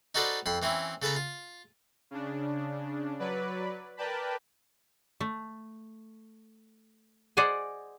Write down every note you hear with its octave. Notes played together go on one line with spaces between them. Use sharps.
D#4 F#4 A4 B4 C5 D5
F2 B5 C6
E3 C4 C#4 E4
C#3 A4 B4 A5 A#5
F4
C#3 D4
F#3 B4 D5
A#4 B4 D5 G5 A5 B5
A3
G#4 C5 D5 D#5 F#5 G#5